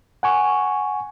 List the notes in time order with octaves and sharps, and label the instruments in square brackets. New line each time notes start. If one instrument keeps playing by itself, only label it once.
[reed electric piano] F#5 G#5 C#6